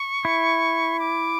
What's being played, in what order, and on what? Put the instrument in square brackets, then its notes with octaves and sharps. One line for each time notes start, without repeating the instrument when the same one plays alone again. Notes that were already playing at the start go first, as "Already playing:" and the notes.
Already playing: [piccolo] C#6
[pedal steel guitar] E4
[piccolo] D6